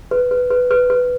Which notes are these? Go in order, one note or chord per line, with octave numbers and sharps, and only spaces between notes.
B4
B4
B4
B4
B4